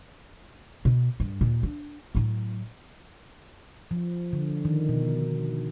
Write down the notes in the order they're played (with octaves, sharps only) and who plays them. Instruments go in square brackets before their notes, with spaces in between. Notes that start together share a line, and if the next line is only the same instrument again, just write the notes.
[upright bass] B2
G2
D#2 A#2
D4
A2 F#3
[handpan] F3
D3
D#3
B2